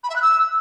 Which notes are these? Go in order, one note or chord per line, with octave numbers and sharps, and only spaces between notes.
B5
E5
F#6
E6